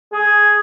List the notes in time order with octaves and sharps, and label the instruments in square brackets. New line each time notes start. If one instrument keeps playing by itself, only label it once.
[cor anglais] G#4